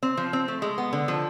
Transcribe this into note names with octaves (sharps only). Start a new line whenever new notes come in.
C4
F3
C4
A3
G#3
B3
D3
F3